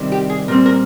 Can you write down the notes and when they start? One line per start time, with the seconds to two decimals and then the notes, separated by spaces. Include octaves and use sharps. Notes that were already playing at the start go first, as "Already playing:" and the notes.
Already playing: C3 D#3 G3 C4
0.12 G4
0.30 G#4
0.48 A#2 G3 C4 A#4
0.66 A#4